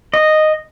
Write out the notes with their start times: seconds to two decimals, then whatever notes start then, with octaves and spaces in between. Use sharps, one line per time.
0.14 D#5